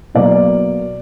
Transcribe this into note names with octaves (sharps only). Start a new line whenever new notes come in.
B2 F#3 A#3 D5